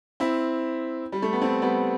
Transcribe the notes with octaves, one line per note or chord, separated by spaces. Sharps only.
C4 E4
G3
A3
B3
A3 C4
G3 B3